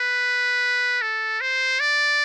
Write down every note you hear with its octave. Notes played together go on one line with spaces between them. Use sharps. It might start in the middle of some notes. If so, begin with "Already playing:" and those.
Already playing: B4
A4
C5
D5